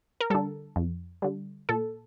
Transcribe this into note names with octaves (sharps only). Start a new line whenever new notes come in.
A#4
D3 G3 A4
F2
D3 G3
A#2 A4